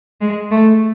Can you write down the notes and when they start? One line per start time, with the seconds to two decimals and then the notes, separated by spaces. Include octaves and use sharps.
0.21 G#3
0.51 A3